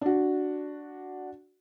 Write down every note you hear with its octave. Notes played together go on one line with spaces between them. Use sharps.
D4 F#4